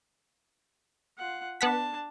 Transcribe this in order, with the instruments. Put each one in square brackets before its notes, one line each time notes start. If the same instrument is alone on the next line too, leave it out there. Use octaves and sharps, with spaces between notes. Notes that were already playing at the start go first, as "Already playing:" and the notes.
[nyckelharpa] F4 F#5
[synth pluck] B3 F#5 B6 [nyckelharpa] D4 A5